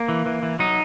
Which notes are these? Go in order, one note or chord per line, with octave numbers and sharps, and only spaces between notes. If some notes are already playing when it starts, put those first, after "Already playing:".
Already playing: A#3
E3
E3
E3
F#3 D#4